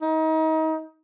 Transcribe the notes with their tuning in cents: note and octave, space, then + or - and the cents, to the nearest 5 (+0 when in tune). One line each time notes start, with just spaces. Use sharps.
D#4 +30